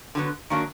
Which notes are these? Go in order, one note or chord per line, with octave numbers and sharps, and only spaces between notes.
D3 F#3 B3
D#3 F#3 A#3 D4 F#4